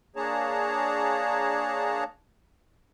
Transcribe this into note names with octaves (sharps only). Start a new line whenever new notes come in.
A#3 D4 G#4 C#5 A5 A#5